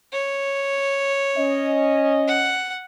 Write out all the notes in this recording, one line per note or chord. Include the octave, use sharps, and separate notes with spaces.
C#5
C#4 D#5
F#5